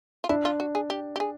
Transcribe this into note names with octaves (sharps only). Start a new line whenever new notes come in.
F4
D4 E4
F4
F#4
G#4
G4
G4
G#4